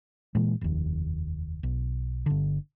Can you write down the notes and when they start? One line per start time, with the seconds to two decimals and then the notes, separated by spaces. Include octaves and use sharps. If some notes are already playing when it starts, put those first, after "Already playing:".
0.35 A#2 E3 G#3
0.61 F1 D#2
1.63 B1
2.26 G1 D3